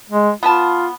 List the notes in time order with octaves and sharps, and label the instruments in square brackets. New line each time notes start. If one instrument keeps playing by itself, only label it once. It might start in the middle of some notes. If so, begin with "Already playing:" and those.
[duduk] G#3
[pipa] B3 B4 A5 [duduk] F4